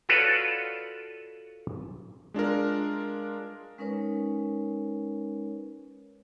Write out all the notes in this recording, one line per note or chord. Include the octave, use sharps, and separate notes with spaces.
F4 F#4 A4 B4 C#5 D5
G#3 D4 F4 A#4
G#3 C#4 D#4 A#4 B4 C#5